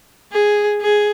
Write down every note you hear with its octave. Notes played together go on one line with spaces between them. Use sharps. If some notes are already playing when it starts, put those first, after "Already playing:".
G#4
G#4